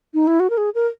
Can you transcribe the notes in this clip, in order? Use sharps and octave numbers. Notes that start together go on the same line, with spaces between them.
D#4
E4
F#4
A#4
G#4
A#4